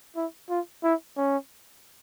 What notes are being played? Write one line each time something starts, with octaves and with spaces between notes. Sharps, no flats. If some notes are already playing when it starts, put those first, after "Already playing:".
E4
F4
E4
C#4